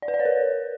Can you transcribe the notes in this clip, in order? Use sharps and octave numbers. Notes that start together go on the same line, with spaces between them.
D5
B4
D5
C#5
A#4